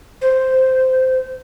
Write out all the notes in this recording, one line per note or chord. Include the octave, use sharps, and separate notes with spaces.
C5